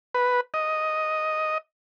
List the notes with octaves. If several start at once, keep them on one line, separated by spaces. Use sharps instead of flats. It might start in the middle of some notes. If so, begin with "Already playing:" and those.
B4
D#5